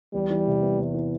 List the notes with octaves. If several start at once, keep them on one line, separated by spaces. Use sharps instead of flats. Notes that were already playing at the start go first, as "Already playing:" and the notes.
E2 G3
E3
C3
B3
E2
E3